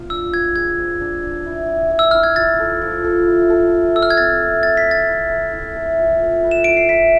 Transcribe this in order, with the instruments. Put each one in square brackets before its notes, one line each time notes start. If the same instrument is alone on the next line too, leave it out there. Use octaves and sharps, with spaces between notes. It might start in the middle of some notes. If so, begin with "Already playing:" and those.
Already playing: [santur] B3 F4
[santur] D4 [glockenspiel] E6
[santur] F4 [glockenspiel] G#6
[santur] G#3 [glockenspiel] G#6
[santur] C5
D4
D4
E4
E4
E5
[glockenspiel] E6
[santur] E4 [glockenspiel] F6
[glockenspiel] G#6
[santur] F3 [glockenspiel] A6
[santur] A4
F3
A4
E4
A4
E4
[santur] A4 [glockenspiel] E6
[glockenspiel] F6
G#6
[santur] C4 [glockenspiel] A6
[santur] A3
[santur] C4 [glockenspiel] A6
[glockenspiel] B6
[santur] C4
[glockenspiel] A6
[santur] E4
A3
E4
A3
F3
A3
B4
[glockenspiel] E7
[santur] E4 [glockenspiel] D7
[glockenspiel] C7
[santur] E4 [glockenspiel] B6